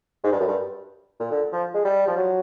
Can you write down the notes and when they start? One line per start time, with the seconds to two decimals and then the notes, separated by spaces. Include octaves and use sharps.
0.24 G#2
0.32 G2
0.39 F#2
0.48 G2
1.20 A#2
1.31 D3
1.52 F3
1.74 G#3
1.85 G3
2.07 F3
2.17 F#3